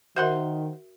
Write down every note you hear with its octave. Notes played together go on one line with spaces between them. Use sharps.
D#3 F#4 A#4 C5 E5 F#5 C6